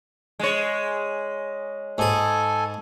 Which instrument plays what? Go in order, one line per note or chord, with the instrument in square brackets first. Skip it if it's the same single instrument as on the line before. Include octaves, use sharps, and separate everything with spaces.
[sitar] G#3 C#5
[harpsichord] G#2 G#4 [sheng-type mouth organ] A4 G#5